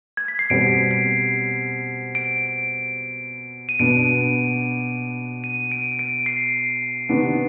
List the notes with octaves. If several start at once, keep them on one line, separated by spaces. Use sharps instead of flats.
G#6
B6
C7
B2 G3 C4 D7
C7
D7
D#7
B2 B3 D4 D7
D#7
D7
D7
C7
C3 D#3 B3 D4